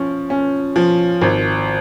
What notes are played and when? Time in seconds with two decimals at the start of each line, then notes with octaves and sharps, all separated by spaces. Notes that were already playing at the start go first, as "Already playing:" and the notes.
Already playing: F3 C#4
0.30 C#4
0.76 F3
1.22 G#1